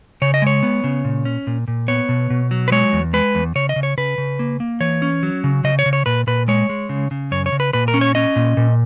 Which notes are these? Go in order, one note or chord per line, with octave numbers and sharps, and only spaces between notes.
C#3 C#5
D#5
G#3 C#5
B3
C#3
A#2
C#4
A#2
A#2
B3 C#5
B2
B2
F#3
B4
G#3 C#5
E2
G#3 B4
E2
C#3 C#5
D#5
C#3
C#5
C#3 B4
C#3
A#3
A#3
E3 C#5
C#4
F#3
C#3
C#3 D#5
C#5
C#3
C#5
A#2 B4
A#2 B4
G#3 C#5
G#3
C#3
C#3
F#2 C#5
C#5
C#3
B4
A#2 B4
A#4
C#4
C#5
C#4 D#5
A#2
A#2